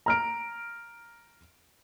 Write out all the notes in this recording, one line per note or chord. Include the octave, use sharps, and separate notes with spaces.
A#5 F6 D7